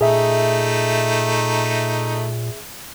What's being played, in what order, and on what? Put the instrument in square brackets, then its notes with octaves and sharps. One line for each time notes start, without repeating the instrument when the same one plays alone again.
[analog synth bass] A#2 [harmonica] A3 D#4 [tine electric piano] G#4 E5